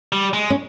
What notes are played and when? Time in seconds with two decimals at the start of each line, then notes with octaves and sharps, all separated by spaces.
0.13 G3
0.33 G#3
0.50 C#4